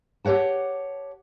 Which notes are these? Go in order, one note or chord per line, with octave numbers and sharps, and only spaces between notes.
G4 A#4 C#5 F#5 A5